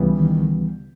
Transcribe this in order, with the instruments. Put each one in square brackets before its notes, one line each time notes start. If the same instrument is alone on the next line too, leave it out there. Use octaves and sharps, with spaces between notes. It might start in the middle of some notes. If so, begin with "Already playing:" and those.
Already playing: [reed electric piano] C#2 C#3 E3 G3 B3
[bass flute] D#3